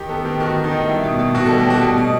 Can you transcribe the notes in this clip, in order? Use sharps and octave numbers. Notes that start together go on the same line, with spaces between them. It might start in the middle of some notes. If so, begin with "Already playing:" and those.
Already playing: D#3 G4
B3 A4
D#3 G4
D#3 F#4
D#3
D#4
D#3
G3 E4
B2
B2
B2 F#4
G3 A4
G4
G3 F#4
B2
B2 D#5